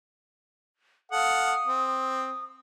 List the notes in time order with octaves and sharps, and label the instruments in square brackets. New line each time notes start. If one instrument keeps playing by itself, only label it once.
[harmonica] A4 F5 F#5 [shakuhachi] D#6
[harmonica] C4